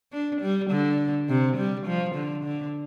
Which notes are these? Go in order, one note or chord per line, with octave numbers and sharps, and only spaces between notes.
D4
G3
D3
C3
G3
F3
D3
D3